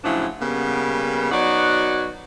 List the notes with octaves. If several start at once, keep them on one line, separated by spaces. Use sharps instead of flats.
A2 C#3 F3 F#3 D4 E4
C#3 G3 A#3 B3
F#3 B3 D#4 F#4 C#5 D5